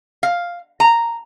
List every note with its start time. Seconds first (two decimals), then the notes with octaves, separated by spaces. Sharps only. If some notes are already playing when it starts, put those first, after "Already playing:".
0.23 F5
0.80 A#5